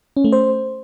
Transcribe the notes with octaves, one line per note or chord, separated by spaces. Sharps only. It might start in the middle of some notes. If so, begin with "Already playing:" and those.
C#4
A3
C5